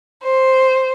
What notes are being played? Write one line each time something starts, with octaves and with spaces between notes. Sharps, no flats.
C5